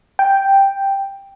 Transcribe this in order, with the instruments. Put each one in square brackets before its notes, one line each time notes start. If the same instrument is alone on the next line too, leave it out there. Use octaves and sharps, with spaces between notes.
[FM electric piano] G5